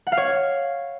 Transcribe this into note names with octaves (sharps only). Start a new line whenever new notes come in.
F#5
F5
C#5